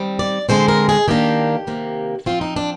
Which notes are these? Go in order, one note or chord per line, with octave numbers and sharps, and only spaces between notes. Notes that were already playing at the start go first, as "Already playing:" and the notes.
Already playing: D#3 G3 C4
D5
D3 G#3 C4 C5
A#4
G#4
D#3 A#3 D4 G4
C3 D#3 A#3
F3 C4 F4
D#4
D4